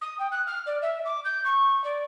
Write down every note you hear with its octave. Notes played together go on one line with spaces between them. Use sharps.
D#6
G5
F#6
F6
D5
E5
D6
G6
C#6
D5